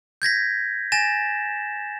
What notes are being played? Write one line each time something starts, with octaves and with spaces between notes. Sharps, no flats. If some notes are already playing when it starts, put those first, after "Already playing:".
G6 G#6 A#6 B6
G#5 A6 A#6 E7